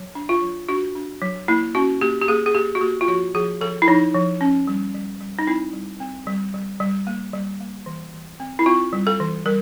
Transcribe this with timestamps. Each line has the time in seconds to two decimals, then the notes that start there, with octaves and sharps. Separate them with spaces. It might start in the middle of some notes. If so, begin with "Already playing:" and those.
Already playing: F#3
0.15 D4
0.29 F4
0.42 F#3
0.69 D4 F#4
0.95 D4
1.22 F#3
1.48 A#3 E4
1.75 C#4 F#4
2.01 A#3 G4
2.22 G4
2.28 A#3 G#4
2.46 G#4
2.55 A#3 G4
2.75 F#4
2.81 A#3 G4
3.01 F4
3.08 F3 F#4
3.35 F3 G#4
3.61 F3 A4
3.82 E4
3.88 F3 D#4
4.14 F3
4.41 C#4
4.67 G3
4.94 G3
5.21 G3
5.39 D#4
5.47 C4 E4
5.73 G3
6.00 C4
6.27 G3
6.54 G3
6.80 G3
7.07 A#3
7.33 G3
7.60 A#3
7.86 E3
8.13 E3
8.40 C4
8.59 E4
8.66 C4 F4
8.93 G3
9.07 A4
9.20 E3
9.46 G3 A#4